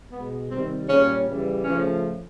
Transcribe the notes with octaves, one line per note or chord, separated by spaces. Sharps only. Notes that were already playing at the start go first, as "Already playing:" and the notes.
B2 G#3 B3
C3 D#3 G3 C4
A#2 G3 C#4
C#3 E3 G3
C#3 F3 A3 C#4